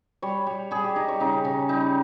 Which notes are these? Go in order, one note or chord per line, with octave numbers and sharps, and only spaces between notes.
G3 C#5
G3
G3 G#4
G4
G3 D#4
C#5
C#3 D#4
C#3 C#4
G3 D#4